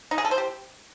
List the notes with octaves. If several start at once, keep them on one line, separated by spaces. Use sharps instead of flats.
D#4
G#4
A4
C5
G4